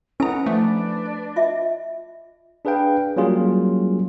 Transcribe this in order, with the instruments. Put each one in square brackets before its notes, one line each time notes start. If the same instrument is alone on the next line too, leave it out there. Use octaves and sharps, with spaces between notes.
[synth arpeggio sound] C#4 A#5 [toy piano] E4 A4 G#5 [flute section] B4 D#5 F#5
[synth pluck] F3 A3 [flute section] D4 B4 D5
[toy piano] F4 D#5 E5
[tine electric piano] D4 G#4 B4 F5 G5
F#3 G3 A#3 C#4 F4 G#4